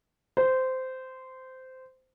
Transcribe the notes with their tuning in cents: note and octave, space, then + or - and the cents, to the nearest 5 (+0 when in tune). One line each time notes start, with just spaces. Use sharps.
C5 -15